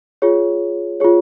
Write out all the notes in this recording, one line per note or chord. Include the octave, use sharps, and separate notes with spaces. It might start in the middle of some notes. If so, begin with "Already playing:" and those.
F4 G#4 C#5
F4 G#4 C#5